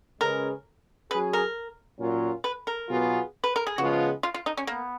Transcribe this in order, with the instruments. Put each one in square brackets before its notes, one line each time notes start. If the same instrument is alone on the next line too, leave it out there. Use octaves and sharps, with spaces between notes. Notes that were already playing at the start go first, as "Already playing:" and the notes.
[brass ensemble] C#3 G#3 C#4 G#4 B4 [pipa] A#4
[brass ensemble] F#3 C#4 G#4 [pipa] B4
[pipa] A#4
[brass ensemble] A#2 F#3 C#4 F4 A#4
[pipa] B4
A#4
[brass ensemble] B2 F#3 B3 F4 G#4
[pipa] B4
A#4
G#4
[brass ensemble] C#3 F3 G#3 B3 F4 [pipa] F#4
[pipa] F4
F4
D#4
C#4
[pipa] A#3 [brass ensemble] B3